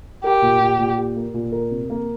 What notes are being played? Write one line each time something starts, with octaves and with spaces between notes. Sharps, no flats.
G4 A#4
A#2
A#2
A#2
G4
A#3
A#2
A#4
C3
A#3